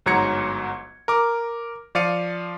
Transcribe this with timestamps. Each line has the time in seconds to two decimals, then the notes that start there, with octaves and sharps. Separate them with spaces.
0.06 G1 G#2 F#3 A#5 G#6 C#7
1.08 A#4 D6
1.95 F3 D5 F5 C#7 D#7